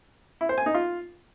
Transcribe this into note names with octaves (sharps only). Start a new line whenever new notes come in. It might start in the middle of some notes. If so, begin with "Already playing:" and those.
E4
C5
G#5
D#4
F4